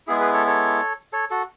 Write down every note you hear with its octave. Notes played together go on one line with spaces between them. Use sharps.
G#3 B3 E4 G#4
G#4 B4
A4 C#5
A4 C#5
A4 C#5
F#4 A4